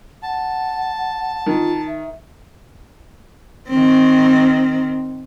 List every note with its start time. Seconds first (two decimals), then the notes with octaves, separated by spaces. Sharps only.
0.23 F#5 A5
1.46 D#3 F4
1.87 E5
3.69 D#3 C4